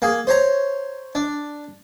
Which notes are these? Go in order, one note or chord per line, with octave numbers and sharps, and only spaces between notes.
A#3 G#4
C5 C#5 A#5
D4